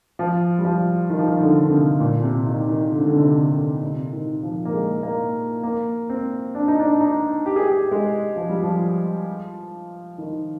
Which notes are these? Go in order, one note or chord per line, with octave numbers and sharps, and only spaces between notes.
F3
G3
F3
D#3
F3
D#3
D3
D3
C3
A#2
C3
D#3
D#3
D3
C3
D3
D3
C3
D3
C3
D#3
F3
A#3
G#3
A#3
A#3
C4
D4
D#4
D4
D#4
G4
G#4
G4
G#3
F3
G3
F3
D#3